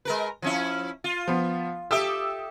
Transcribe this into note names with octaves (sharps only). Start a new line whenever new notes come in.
G#3 A#4 B4
F3 C#4 E4
F4
F3 B3
G4 A4 E5 D#6 E6